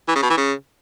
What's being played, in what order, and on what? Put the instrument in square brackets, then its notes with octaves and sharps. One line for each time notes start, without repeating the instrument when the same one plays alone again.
[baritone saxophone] E3
C#3
B2
E3
C#3